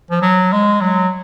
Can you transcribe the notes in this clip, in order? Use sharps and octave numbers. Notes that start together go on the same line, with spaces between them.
F3
F#3
G#3
F#3